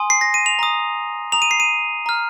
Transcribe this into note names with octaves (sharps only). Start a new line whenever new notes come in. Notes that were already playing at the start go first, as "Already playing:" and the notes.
Already playing: G#5 C6 D#6
C7
A#6
D#7
F7
A#5 D#6
A#5 D#6 F7
D#7
C7
D#7
A#5 F6